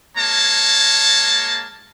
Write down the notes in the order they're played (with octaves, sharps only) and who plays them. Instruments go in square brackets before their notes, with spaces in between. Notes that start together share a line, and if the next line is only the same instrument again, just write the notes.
[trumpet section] G#3 A#3 C#5 A5